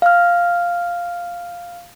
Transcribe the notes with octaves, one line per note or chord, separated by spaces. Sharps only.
F5 F6